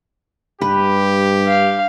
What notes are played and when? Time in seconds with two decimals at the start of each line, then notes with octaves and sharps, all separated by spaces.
0.61 G2 G4 B4
1.47 F5